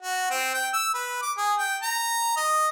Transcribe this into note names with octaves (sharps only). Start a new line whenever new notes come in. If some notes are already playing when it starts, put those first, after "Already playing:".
F#4
C4
G5
E6
B4
D6
G#4
G5
A#5
D#5